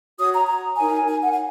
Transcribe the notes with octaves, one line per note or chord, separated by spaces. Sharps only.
F#4 C#5 D#6
A#5
A#5
D#4 A#4 C#5 G#5
G#5
F#5
G#5